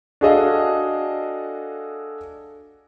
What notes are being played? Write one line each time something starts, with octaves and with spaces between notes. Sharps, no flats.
D4 F#4 G#4 A4 D#5 F5